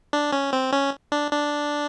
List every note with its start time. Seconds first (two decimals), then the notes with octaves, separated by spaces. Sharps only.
0.13 D4
0.33 C#4
0.53 C4
0.72 C#4
1.12 D4
1.31 D4